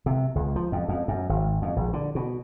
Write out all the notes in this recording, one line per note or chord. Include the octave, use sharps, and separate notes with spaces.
C3
C#2
F3
F2
F2
F#2
G#1
F2
A#1
D3
B2